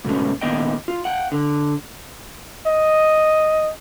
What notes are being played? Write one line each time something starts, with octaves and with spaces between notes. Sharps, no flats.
G#2 B2 A3 C#4
A#2 D#3 B3 D#5 G5
F4
F#5 G5
D3
D#5